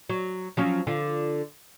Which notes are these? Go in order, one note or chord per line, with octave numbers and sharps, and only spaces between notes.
F#3
F3 F#3 C#4
D3 F4